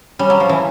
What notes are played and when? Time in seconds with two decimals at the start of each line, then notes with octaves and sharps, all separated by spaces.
0.19 G3 C#4
0.30 F#3
0.40 F3
0.49 E3